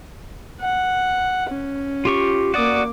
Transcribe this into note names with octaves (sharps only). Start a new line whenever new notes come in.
F#5
C#4
F4 G4 C#6
A#3 F#4 D5 D6 D#6